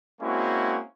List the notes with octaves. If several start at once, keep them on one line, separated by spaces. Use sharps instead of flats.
G#3 A#3 C4 C#4 E4 F#4